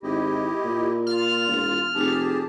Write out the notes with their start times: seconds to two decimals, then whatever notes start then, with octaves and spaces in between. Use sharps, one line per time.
0.03 G#1 E4 G4 D#5
0.64 A#2
1.07 F4 F6
1.48 E1
1.95 F1 G4 G#4 A5